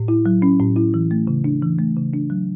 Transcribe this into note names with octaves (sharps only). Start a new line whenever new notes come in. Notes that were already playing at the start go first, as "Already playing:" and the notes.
Already playing: A2
E4
F#3
C#4
A2
E4
E3
A3
C#3
D4
E3
A3
C#3
D4
F#3